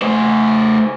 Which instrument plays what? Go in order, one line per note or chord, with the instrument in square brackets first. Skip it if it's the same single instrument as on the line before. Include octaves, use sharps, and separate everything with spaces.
[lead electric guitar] A3 C5